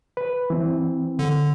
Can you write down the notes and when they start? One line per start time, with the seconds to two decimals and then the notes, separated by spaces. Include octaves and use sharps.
0.17 B4
0.50 E3 C4
1.19 D3